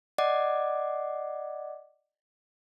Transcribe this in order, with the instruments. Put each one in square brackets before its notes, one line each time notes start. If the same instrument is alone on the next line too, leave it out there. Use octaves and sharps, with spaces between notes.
[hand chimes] D5 D#5 F#5 D6